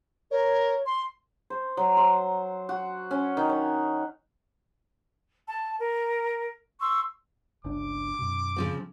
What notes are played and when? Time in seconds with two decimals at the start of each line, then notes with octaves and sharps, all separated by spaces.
0.31 A#4 C#5
0.86 C6
1.50 C5
1.77 F#3
1.97 C5
2.69 F#4
3.11 C#4
3.37 D#3
3.49 C#5
5.47 A5
5.78 A#4
6.80 C6 C#6 E6
7.64 G1 C#2 D4 D6
8.19 F#2 B2
8.57 C#3 F3 C4